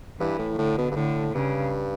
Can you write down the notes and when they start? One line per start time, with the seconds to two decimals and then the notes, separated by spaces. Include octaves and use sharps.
0.20 G2 E3
0.39 A2
0.58 A2 D3
0.78 B2
0.91 G2
0.96 A2 D3
1.34 G2 C#3